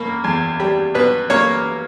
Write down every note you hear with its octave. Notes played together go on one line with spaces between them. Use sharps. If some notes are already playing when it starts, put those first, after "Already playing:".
Already playing: B2 A#3
E2
G3
B2 B4
A#3 C#5